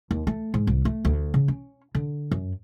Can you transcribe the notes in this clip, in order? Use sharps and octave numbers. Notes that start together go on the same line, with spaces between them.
D#2
A3
G#2
C2
A3
D2
C#3
C#4
D3
F#2